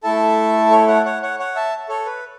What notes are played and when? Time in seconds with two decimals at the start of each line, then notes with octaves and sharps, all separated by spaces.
0.03 A3 E4 A4 E5 A5
0.71 A4 C#5
0.88 C#5 F#5
1.05 C#5 F#5
1.22 C#5 F#5
1.39 C#5 F#5
1.55 E5 A5
1.89 A4 C#5
2.06 B4